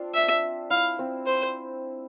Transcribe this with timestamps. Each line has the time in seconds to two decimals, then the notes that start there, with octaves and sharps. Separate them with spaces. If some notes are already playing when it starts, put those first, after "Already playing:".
Already playing: C4 D4 F4
0.14 E5
0.70 E4 F5
0.99 C4
1.27 C5